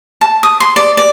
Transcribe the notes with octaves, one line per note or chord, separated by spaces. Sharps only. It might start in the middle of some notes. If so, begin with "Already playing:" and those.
A5
D#6
C6
D5
D5